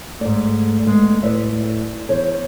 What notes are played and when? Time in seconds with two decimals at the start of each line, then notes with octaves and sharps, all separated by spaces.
0.21 G#2 A3 D5
0.87 G#3 B3
1.23 A2 B4 D5 E5
2.09 E2 C5 C#5